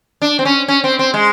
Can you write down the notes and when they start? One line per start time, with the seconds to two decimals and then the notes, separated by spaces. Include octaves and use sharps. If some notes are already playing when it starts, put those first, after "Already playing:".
0.22 D4
0.39 C4
0.45 C#4
0.68 C#4
0.84 C4
0.99 C4
1.14 G#3